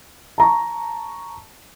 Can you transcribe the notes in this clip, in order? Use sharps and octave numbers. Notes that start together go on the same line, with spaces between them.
A5 A#5 C#6